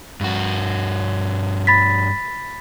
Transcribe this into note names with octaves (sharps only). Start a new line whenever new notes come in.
G2 F#4
B5 A6 B6